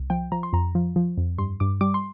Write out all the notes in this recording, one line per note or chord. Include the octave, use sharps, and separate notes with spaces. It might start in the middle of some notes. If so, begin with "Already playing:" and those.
Already playing: C2
F3 G5
F3 A#5
C6
F2 A#5
F3
F3
F2
G2 C6
G2 D6
G3 D6
C6